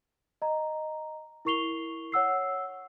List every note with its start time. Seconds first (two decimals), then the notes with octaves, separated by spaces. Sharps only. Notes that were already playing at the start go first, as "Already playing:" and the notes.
0.42 D#5 A#5
1.45 E4 A#4 C#6 C7 F7 G7
2.12 C#5 F#5 E6 C7